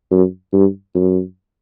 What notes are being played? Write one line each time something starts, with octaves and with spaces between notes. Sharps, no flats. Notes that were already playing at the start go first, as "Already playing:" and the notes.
F#2
G2
F#2